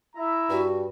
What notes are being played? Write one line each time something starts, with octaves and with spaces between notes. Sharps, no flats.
E4 E5 A#5
G2 F#4